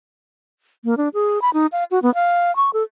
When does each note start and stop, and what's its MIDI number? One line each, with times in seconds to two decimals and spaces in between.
0.84 0.97 58
0.97 1.09 62
1.14 1.41 68
1.42 1.50 83
1.54 1.66 63
1.72 1.84 77
1.91 1.99 66
2.03 2.13 59
2.15 2.54 77
2.56 2.70 85
2.73 2.83 69